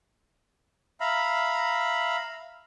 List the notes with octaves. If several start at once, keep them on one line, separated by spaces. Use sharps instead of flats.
E5 F5 A#5 B5